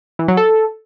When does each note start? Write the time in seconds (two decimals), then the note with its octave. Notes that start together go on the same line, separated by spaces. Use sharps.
0.19 E3
0.28 F#3
0.37 A4